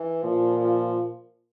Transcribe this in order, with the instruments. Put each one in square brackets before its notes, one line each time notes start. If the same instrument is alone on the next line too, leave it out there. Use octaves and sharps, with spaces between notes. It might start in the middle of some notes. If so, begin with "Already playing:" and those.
Already playing: [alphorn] E3
[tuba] A#2 [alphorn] F3
[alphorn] F3